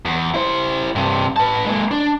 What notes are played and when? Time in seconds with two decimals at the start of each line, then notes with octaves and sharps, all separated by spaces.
0.05 E2
0.34 E4 C5
0.95 G2 C3
1.36 B4 A5
1.65 G#3 A#3
1.91 D4